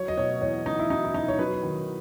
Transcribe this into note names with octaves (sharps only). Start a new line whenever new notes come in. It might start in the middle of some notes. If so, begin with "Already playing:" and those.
Already playing: F#3 C#5
D#5
B2 C#5
E2 C#5
E2 D#4
E4
F#3 D#4
E4
B2 D#4
C#5
F#3 B4
D#3